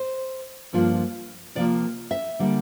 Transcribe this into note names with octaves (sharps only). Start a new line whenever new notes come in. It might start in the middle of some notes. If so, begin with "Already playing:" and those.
Already playing: C5
G2 F3 A#3 D4 F4
C3 F3 A#3 F4 D5
E5
D3 G3 A#3